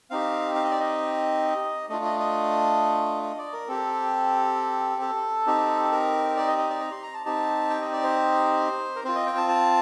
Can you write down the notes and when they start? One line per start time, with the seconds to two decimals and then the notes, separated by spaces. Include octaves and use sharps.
0.10 C4 D#4 G4 F5
0.55 F5
0.64 D#5
0.71 D5
0.80 D#5
1.89 A3 D4 F4 D#5
2.04 D#5
2.19 D#5
3.23 D#5
3.38 D5
3.53 A#4
3.68 C4 G4 A4
5.02 A4
5.47 C4 D#4 G4
5.92 A#4
6.36 D5
6.47 D#5
6.58 D#5
6.70 D5
6.80 A#5
6.91 C6
7.03 A#5
7.14 A5
7.25 C4 D#4 G4 A5
7.70 G5
7.81 D#5
7.92 D5
8.04 C5
8.96 A#4
9.05 C4 F4 C5
9.15 D#5
9.27 G5
9.37 A5
9.49 A5